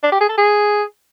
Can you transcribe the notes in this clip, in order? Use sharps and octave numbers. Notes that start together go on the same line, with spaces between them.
D4
G4
G#4
A4
G#4